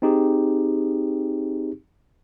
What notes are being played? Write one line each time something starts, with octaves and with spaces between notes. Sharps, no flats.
C4 D#4 G4 G#4